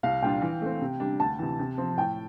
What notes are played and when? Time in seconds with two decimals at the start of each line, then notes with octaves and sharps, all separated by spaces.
0.03 C2 F5
0.22 A#2 G3 D4 F4 G5
0.42 E3
0.62 A3 C4
0.82 C3
1.00 G3 D4
1.20 D2 A5
1.39 C3 E3
1.59 C3
1.78 F3 C4
1.98 A2 G5